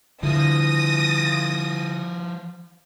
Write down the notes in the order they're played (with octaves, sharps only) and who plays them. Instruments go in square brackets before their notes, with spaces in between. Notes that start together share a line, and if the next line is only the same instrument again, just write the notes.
[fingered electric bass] D3 [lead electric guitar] F3 E4 [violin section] D#6 A#6